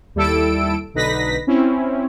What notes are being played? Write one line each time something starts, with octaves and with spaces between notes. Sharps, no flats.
D#2 G3 E4 A4 E6 D7
B1 D3 D#4 B4 A#6 B6
C4 C#4 E4